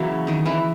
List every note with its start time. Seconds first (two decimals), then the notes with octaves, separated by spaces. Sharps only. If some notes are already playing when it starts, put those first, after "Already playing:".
Already playing: C#3 E3 F#3 A#3 E4
0.27 D#3 D#4
0.46 E3 E4